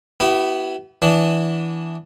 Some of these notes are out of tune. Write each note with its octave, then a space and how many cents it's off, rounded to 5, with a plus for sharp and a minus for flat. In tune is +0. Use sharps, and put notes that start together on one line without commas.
B3 -5 E4 +0 G4 -45
E3 +0 B3 +0 D4 -15